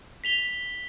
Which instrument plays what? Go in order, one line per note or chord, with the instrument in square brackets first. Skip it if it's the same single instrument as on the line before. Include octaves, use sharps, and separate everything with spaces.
[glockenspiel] B6 F7 G7